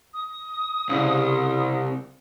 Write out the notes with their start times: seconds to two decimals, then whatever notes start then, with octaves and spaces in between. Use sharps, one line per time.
0.14 D#6
0.89 C2 C#3